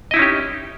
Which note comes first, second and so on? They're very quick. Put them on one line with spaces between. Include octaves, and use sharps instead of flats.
D#5 E4 D#4 C#4 G4